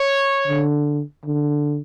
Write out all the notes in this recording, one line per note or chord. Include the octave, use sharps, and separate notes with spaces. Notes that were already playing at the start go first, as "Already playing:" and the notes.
Already playing: C#5
D3
D3